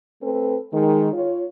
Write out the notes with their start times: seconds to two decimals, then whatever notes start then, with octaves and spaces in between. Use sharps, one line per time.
0.21 A3 C4 A4 B4
0.73 D#3 G#3
1.13 F4 C#5